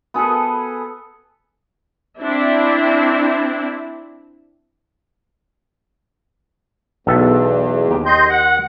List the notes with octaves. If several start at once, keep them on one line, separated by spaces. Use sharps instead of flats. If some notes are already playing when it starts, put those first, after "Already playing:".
B3 G#4 A4 B4
C4 D4 E4
B1 E2 A4 E5
D#2 D#3 G4
D#5 C6 G6
F#5